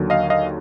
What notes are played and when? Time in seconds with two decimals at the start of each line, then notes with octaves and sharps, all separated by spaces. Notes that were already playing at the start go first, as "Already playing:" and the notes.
Already playing: D#2 D3 F#3
0.10 D#5 F5
0.30 D#5 F5